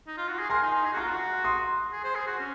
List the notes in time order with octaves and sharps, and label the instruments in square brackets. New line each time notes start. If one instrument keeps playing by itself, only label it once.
[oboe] D#4
F4
F#4
G#4
[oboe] A#4 [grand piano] G#5 C6
[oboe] D#4
D#4
G#4
F#4
[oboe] F4 [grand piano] A#5 C#6
[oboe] F#4
[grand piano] C6 D#6
[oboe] G#4
C5
G#4
F#4
C#4